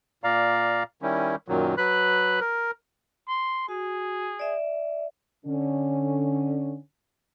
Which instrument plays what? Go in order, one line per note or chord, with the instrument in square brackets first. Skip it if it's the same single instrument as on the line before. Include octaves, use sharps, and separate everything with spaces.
[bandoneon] A#2 D5 F5 A#5
D#3 G3 C#4 E4
F#2 A#2 D#3 F#3
F#3 B4 B5 F#6
A#4
[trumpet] C6
[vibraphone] F#4 [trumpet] G#4
[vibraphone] D5 E5
[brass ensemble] D3 C#4